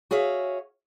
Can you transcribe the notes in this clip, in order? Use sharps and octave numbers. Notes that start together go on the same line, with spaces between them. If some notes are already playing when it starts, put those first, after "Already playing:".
F#4 G#4 C#5 E5 F5